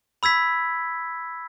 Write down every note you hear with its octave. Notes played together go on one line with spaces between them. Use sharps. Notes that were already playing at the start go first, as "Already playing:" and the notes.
B5 E6 G#6 B6